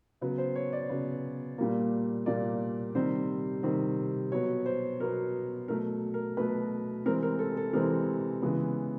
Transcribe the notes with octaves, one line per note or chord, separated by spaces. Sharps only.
C#3 F#3 B3
C5
C#5
D5
C#3 F#3 B3
A#2 G3 A#3
A#2 G3 A#3 D5
C3 D#3 G3 C4 C5
C3 D#3 G3 C4
B2 F#3 B3 C#5
C5
B2 F#3 B3 A#4
B2 F#3 A3 A#4
A#4
B2 F#3 A3 B4
C3 E3 G#3 C4 A#4
A#4
A4
A4
C3 E3 G#3 C4 A#4
C#3 E3 G#3 B3